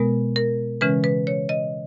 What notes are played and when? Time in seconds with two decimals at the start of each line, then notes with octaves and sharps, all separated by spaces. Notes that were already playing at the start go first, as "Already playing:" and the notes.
Already playing: B2 G#3 B3 A#4
0.36 A#4
0.81 C#3 E3 G#3 C#4 B4
1.04 B4
1.27 C#5
1.49 D#5